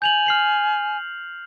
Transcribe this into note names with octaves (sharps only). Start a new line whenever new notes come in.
G#5 G6 F7 F#7
F6 C7 F#7